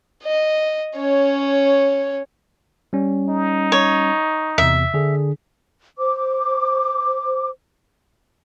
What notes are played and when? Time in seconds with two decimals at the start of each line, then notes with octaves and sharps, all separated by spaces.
0.23 D#5
0.96 C#4 C#5
2.93 G3 C#4
3.29 D#4
3.72 C#5
4.58 E2 C3 E5
4.94 D3 D4 G#4
5.98 C5 D6